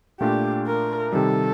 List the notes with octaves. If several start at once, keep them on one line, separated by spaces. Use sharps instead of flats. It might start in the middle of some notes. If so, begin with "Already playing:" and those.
A#2 A3 D4 F4 G4
A#4
C3 D#3 G3 A4